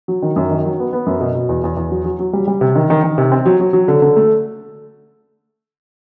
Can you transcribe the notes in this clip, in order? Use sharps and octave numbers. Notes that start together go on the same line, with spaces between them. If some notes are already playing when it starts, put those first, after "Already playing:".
F#3
D#3
F#2
D#3
F#3
B3
B3
F#2
B2
B2
E2
E2
E2
F#3
F#3
F#3
G3
G3
C3
D#3
D#3
D#3
C3
C4
F#3
F#3
F#3
D3
D3
A3